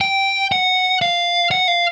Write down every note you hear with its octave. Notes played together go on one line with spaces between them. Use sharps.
G5
F#5
F5
F#5
F5